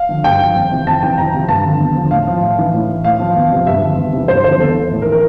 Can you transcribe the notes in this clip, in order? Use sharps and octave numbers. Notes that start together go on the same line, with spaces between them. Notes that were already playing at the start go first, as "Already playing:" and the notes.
Already playing: F5
D3 F3
G2 G5
F3
F2
C3 E3
F2 A5
C3 E3 G5
F2 A#5
C3 F3
G2 A5
D3 F3
E2
D3 F3
A2 F5
F3
A2
E3
A2
E3
A2 F5
F3
E2
C3 F3
G2 E5
D3 F3
E2
C3 E3
G2 C5
D3 F3 C5
E2 A4
E3
A2
A#4
E3
A#4